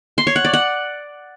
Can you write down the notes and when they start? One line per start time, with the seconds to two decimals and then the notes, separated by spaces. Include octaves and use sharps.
0.18 C6
0.27 C#5
0.36 F#5
0.45 D5
0.53 F#5